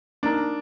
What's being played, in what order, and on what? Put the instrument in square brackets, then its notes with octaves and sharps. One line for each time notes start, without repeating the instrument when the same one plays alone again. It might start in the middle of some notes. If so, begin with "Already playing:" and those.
[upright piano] A#3 D#4 A#4 [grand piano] D4